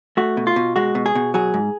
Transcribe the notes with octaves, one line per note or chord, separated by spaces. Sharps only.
A3 F#4
B2
F4
B2
G#3 F#4
B2
G#4
B2
F#3 G#4
G#2